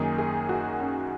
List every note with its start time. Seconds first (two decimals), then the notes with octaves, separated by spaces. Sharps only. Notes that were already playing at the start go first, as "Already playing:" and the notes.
Already playing: F#2 D#3 A#3 D#4 G#4
0.18 G#4
0.49 F#4
0.80 C#4